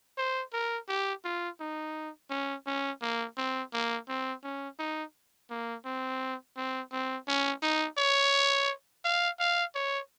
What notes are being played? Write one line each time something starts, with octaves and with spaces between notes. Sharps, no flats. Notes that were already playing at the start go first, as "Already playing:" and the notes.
C5
A#4
G4
F4
D#4
C#4
C#4
A#3
C4
A#3
C4
C#4
D#4
A#3
C4
C4
C4
C#4
D#4
C#5
F5
F5
C#5